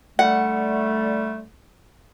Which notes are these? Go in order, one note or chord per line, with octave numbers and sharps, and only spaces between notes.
D3 G3 A3 F#5